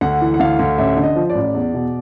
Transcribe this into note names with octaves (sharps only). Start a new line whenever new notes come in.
D2 F#5
E3
F#5
D2 F5
D2
A1 E5
D3
D#5
F3
D5
A1
E2
B2